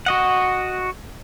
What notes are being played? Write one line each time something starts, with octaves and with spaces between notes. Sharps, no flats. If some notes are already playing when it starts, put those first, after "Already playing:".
F#4 D#5 F#5